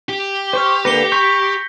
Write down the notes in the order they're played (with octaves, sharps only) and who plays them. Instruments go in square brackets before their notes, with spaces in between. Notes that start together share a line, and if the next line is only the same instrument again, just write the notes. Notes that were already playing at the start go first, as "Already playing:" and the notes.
[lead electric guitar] G4
[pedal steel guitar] C5 C#6 F6
[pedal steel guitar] D3 A#3 B4 [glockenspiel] A#6 C#7 G7
[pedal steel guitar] B5 C#6 [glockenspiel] G6 B6